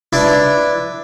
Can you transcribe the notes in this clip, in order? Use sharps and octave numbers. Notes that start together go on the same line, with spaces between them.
D4 E4 B4